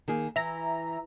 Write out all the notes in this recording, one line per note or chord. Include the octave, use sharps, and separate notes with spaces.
D#3 A#3 G#4
E3 E5 A#5